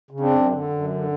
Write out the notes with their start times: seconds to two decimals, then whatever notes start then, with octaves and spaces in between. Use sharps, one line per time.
0.11 C#3
0.20 C4 D4
0.30 F#2
0.50 D3
0.70 F#2
0.90 D3